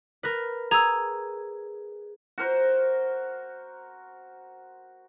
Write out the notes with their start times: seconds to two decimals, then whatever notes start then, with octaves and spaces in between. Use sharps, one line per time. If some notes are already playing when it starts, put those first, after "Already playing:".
0.23 A#4 B4
0.71 G#4 A#5 E6
2.38 F#4 A#4 C5